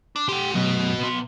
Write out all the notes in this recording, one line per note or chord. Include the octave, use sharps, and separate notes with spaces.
D4
G4 C5 F#5
F#2 B2 F#4 D#5
B2 C6